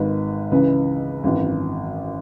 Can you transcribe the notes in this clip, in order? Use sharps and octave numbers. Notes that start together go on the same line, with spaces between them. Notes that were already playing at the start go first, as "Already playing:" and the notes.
Already playing: G#1 G#2 D#3 B4
C#2 C#3 E3 B4
G#1 F#2 E3 B4